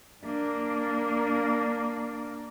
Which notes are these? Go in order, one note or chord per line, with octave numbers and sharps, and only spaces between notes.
A#3 D4